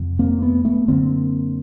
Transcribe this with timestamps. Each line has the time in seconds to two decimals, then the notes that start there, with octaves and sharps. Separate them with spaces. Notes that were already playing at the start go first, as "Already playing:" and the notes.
Already playing: F2 C3
0.19 A#3 C4
0.42 A3 B3
0.65 A3 B3
0.88 F#2 D3 A#3 C4